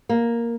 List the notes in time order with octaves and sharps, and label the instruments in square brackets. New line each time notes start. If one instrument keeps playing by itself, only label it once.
[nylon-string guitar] A#3